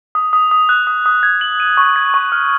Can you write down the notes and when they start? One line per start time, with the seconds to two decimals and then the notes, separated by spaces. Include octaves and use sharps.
0.15 D#6
0.33 D#6
0.51 D#6
0.69 F#6
0.87 D#6
1.06 D#6
1.23 G#6
1.41 F#7
1.60 D#7
1.77 C#6
1.96 G#6
2.14 C#6
2.32 F6